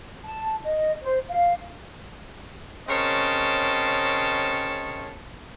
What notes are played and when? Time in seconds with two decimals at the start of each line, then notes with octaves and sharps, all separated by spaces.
0.24 A5
0.64 D#5
1.03 C5
1.29 F5
2.88 C#3 C4 A#4 C#5 D#5 A5